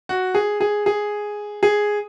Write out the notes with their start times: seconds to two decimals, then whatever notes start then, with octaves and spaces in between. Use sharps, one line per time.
0.09 F#4
0.35 G#4
0.61 G#4
0.86 G#4
1.63 G#4